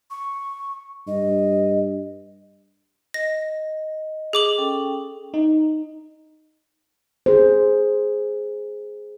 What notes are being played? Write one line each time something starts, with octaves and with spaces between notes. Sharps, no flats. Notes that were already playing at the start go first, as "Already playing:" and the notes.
C#6
G2 D#5
D#5 A#6
G#4 D6 F#7
C#4 A4 G5
D#4
G#4 C5